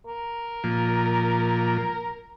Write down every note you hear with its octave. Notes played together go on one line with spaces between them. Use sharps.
A#4
A#2 F3